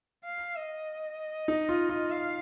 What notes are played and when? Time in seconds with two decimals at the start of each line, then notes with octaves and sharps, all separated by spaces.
0.25 F5
0.56 D#5
1.48 D#4
1.69 F4
1.89 F4
2.11 F5